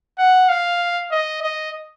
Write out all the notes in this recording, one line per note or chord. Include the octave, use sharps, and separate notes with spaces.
F#5
F5
D#5
D#5